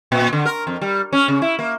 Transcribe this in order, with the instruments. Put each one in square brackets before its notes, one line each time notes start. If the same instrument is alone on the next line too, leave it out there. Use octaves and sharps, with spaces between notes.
[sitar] A#2
D3
A#4
F2
G3
C#4
C#3
E4
A#3